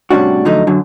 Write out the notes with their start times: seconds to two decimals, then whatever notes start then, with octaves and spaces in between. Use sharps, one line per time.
0.11 A2 C3 G3 C#4 D4 F#4
0.45 D3 F3 F#3 A3 D#4
0.67 F#2 D3 F#3